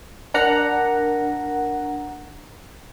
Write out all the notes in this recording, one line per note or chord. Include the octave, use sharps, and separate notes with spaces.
D4 A#4 F#5 A#5